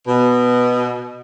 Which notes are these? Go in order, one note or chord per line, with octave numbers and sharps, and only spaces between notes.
B2